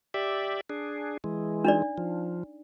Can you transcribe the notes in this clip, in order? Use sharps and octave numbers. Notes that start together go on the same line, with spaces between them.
G4 D5 E5
D4 G#4
E3 G#3
D4 D#4 D5
F3